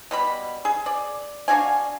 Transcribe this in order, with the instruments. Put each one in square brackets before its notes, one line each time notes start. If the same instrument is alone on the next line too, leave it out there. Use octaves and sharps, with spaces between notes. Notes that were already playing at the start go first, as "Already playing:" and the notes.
[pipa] B2 G3 B5
G#4
D5
D4 F#4 F5 G#5